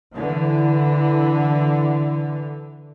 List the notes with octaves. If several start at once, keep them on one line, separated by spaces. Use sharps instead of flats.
D3 E3